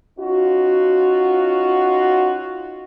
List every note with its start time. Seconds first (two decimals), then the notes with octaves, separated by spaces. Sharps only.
0.19 C#4 D#4 F4 F#4